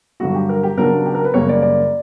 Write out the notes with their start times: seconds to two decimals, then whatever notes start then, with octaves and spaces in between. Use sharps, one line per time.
0.20 G2 D3 F#3 F#4
0.34 G4
0.49 A#4
0.63 G4
0.77 C#3 F#3 B3 D4 A#4
1.06 G4
1.15 A#4
1.25 B4
1.34 F#2 C#3 G3 A#3 C#5
1.49 D5
1.62 D5